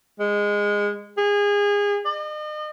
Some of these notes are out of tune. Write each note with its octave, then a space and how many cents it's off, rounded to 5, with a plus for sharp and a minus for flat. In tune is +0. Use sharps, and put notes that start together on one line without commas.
G#3 -15
G#4 -25
D#5 -40